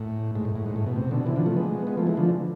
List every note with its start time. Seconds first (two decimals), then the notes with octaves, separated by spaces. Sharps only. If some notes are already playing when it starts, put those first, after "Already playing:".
Already playing: A2
0.35 G#2
0.45 A2
0.56 A2
0.66 G#2
0.76 A2
0.86 B2
0.96 C3
1.11 B2 D3
1.26 C3 E3
1.36 D3 F3
1.46 F3 A3
1.57 G#3 B3
1.87 G#3 B3
1.97 F3 A3
2.07 E3 G#3
2.17 D3 F3